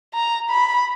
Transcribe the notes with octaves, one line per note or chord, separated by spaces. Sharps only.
A#5
B5